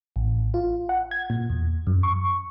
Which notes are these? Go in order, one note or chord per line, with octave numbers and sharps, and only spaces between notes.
A1
F4
F#5
G#6
A#2
E2
F#2
C#6